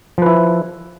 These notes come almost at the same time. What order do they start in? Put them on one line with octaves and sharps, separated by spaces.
F3 B4 E4